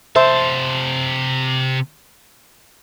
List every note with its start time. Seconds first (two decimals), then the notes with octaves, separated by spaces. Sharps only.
0.16 C3 C5 E5 A5